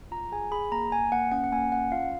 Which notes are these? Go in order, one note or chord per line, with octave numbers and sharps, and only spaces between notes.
F4 A#5
G#4 G#5
G#4 B5
A#3 A#5
A#3 G#5
A#3 F#5
C#4 F#5
F#5
A#3 G#5
C#4 F#5
F4 F5